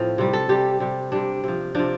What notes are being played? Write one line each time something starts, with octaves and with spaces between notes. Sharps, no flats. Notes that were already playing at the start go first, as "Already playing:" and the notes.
Already playing: A2 F3 C4
C3 G3
A4
C3 G3 G4
C3 G3
C3 G3 D4
C3 F3
C3 F3 D4